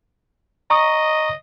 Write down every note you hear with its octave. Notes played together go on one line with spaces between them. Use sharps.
D#5 A#5 C#6 D#6